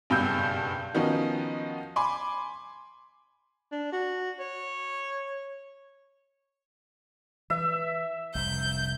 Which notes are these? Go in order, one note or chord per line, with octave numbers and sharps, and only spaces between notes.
F#1 G2 B2 G4 E6 G6
D#3 F3 B3 C#4 D#4 F#4
G#5 B5 C6 D6
D4
F#4
C#5
E3 E5
F1 C2 G6